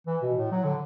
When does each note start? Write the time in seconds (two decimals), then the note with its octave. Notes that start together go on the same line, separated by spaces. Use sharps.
0.07 E3
0.22 B2
0.37 A2
0.52 F#3
0.64 D3